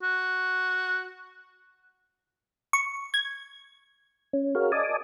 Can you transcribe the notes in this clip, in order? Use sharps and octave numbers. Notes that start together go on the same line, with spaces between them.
F#4
C#6
G#6
C#4
F#4 G#4 A#4 C#5 F5
D5 D#5 G#5 A5 D6 D#6